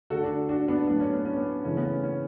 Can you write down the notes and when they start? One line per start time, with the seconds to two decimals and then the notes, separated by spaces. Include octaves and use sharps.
0.10 D3 A3 F#4 A4
0.23 D4 F#4
0.49 D4 F#4
0.68 B3 D4
0.87 A2 F#3 A3 B3 D4
1.00 C#4
1.13 B3
1.25 C#4
1.36 B3
1.64 C#3 E3 A3 C#4
1.77 B3
1.84 C#4
2.03 C#4